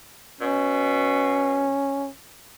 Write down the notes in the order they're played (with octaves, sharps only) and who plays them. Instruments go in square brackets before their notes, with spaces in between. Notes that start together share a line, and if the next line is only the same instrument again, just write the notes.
[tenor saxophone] B2 [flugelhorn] C#4